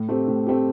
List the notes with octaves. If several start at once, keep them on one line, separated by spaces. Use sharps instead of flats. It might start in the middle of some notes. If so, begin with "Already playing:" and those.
Already playing: A2
A3 C4 G4
A2
A3 C4 G4